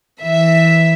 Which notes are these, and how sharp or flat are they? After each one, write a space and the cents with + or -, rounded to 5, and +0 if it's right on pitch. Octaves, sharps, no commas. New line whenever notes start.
E3 -10 E5 +0